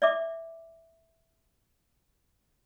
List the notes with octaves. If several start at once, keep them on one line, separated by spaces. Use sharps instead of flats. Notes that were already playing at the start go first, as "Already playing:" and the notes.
D5 E5 D6